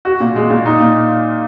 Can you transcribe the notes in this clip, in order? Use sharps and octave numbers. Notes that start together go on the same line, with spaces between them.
F#4
A#2
G#3
A#2
D#4
A#2